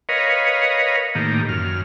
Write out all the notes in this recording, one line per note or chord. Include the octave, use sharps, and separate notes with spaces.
A#4 B4 C#5 D#5 F5
A2 D#3 A#3 G4
F#2 F6